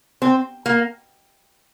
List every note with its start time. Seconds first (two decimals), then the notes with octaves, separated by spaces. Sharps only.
0.22 C4
0.66 A#3